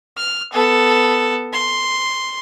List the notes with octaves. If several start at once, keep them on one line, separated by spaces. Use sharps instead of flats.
F6
B3 A4
C6